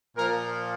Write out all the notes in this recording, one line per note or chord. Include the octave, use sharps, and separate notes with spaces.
A#2 F3 A#4